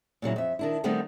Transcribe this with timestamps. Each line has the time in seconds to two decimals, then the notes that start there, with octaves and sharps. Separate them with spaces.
0.22 A#2 C#3 F#3 E4
0.36 F2 E5
0.59 D#3 D4 E4
0.84 D#3 G3 A3 B3 C4 D#4